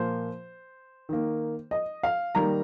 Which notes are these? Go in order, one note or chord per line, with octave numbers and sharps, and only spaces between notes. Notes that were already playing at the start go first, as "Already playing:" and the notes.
Already playing: A#2 F3 A#3 C5
D#3 A#3
D#5
F5
D#3 G3 A#3 A#5